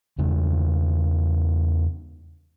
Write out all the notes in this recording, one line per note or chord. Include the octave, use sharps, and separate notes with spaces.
E2 C#3 G#3